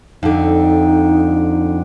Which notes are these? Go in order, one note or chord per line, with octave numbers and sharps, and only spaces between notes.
F2 D3 D#4